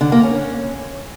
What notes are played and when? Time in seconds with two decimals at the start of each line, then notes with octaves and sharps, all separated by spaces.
0.01 D3
0.12 A#3
0.23 C#4